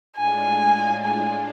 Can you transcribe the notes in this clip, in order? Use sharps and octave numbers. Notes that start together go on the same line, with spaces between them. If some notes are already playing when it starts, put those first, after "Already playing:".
A2 G#3 D4 F4 G#5
G#5